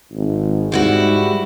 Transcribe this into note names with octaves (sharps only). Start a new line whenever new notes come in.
G#1
G#2 G3 E4 F#4